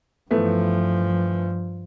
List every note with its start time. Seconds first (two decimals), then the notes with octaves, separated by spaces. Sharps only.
0.31 G2 E3 F3 A3 B3